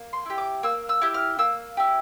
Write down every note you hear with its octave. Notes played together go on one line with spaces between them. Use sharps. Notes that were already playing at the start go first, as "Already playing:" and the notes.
Already playing: A#3
C6
E4 G4
D6
A#3 E6
E6
E4 G4
F6
A#3 E6
E4 G4